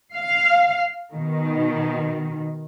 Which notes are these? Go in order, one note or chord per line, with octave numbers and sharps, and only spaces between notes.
F5
B2 D#3